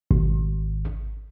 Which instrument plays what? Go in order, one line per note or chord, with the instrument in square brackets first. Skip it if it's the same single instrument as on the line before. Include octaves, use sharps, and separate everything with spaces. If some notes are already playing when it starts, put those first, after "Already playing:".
[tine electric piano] G#1